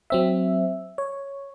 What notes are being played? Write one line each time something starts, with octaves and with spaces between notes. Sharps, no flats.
F#3 C4 E5
C#5